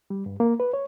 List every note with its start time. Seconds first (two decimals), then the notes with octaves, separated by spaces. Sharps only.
0.10 G3
0.26 G2
0.40 A#3
0.60 B4
0.73 C#5